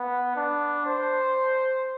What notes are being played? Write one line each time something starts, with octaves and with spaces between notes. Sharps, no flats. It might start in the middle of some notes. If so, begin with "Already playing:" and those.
Already playing: B3
D4
C5